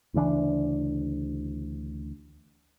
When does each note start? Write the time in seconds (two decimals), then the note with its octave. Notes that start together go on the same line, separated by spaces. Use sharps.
0.14 D2 C#3 E3 D4